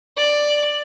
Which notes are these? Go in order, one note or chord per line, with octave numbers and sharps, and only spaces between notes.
D5